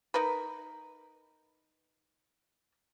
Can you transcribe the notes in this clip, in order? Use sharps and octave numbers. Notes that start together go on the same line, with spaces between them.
D#4 A#4 B4